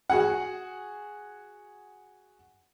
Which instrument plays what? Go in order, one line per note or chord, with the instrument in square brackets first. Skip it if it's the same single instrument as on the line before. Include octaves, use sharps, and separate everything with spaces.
[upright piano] F#4 G#4 F#5